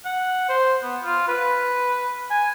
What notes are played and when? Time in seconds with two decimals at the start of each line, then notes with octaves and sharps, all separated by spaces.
0.05 F#5
0.49 C5
0.83 B3
1.04 F4
1.28 B4
2.30 G#5